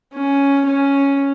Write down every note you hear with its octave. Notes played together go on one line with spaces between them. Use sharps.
C#4
C#4